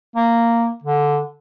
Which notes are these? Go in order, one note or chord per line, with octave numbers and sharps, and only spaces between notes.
A#3
D3